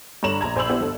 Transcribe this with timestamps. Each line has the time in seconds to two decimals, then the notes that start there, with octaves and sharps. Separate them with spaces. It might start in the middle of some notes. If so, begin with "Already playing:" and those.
0.23 G2 D3 C#5 A#5 E7 F#7
0.41 A#1 A#5 G#6
0.56 A#1 C5 G#5 B5 E6 F#7
0.69 B3 E4 G4 C5 D5
0.80 G1 A4